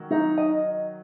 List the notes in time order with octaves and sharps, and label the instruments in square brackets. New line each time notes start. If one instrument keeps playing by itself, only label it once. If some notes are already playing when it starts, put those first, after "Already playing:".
Already playing: [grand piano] D#3 F#3
[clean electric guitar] D#4
D#5